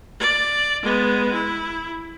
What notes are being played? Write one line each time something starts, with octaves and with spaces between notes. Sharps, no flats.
D5
G#3 B3
E4